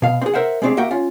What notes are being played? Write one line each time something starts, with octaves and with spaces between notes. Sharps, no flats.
B2 F5
C4 G#4
A#4 C5 E5 F#5
G#3 A3 C4 D4 G4 G#4
A#3 F#4 E5 F#5 G5
C#4 F4